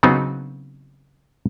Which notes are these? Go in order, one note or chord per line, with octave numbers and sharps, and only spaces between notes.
C#3 F#3 B3 C4 D#4 F#4